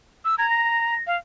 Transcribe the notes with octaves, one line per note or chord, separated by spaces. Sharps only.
E6
A#5 G#6
A#6
F5